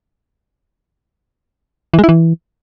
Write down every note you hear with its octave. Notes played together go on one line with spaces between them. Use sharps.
E3
G#3
E4
E3